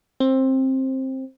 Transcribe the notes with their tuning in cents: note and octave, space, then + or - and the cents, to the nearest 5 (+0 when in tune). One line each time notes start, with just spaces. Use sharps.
C4 +15